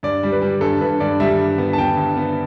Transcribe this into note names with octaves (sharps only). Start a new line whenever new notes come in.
G2 D5
G3
B4
G3
G2 A4
G2 B4
G2 D5
G3 E5
G2
B3
A5
B3 G5
G2
B3